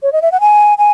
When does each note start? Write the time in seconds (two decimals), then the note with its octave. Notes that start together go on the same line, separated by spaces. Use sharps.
0.03 C#5
0.13 D#5
0.22 E5
0.32 F#5
0.41 G#5
0.78 G#5